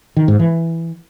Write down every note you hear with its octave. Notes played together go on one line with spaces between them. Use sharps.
D#3
G#2
E3